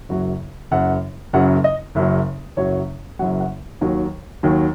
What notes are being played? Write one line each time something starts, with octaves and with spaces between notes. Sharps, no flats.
F#1 F#2 F#3 F#4
F#1 F#2 F#3 F#5
F#1 F#2 C#3 F#3 F#5
D#5
F#1 F#2 C#3 F#3
F#1 F#2 F#3 C#5
F#1 F#2 F#3 F#5
F#5
D#2 D#3 F#3
D#2 D#3 F#3